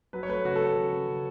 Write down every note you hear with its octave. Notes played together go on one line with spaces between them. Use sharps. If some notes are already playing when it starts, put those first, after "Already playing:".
F#3 B4
C#5
A3 B4
C#3 F#4
A3 A4
B4
C#3
C#3
C#3